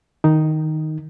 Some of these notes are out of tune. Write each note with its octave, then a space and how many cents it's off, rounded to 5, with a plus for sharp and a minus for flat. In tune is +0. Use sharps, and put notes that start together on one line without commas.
D#3 +0 D#4 +0